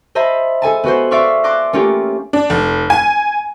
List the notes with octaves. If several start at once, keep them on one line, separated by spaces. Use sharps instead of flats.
C5 D#5 E5 A5 B5
G#4 A4 G#5 A5
B3 F#4 B4 C5
D5 E5 F5 C6 C#6
A5 C6 D6 F#6 A#6
A3 A#3 C#4 F4 G4
D4
F1
G#5